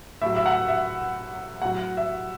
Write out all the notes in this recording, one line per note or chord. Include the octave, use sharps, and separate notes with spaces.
A2 F#3 E5
E5
F#5
E5
A2 F#3 F#5
E5